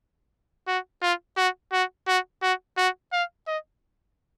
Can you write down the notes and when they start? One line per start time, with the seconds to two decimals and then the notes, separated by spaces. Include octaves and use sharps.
0.67 F#4
1.02 F4
1.37 F#4
1.73 F#4
2.07 F#4
2.42 F#4
2.77 F#4
3.13 F5
3.47 D#5